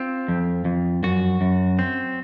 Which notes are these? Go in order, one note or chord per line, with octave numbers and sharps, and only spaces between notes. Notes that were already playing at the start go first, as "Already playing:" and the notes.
Already playing: C4 F4
F2
F2
F#2 F#4
F#2
C4